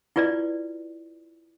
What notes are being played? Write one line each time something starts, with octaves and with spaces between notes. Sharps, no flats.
E4 F4 B4 D5